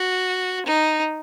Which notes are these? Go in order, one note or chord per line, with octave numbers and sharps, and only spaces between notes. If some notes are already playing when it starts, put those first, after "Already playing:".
Already playing: F#4
D#4